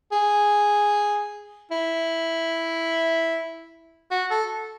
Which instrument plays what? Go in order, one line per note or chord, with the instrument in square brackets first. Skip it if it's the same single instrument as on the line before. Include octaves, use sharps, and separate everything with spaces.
[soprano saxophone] G#4
E4
F#4
A4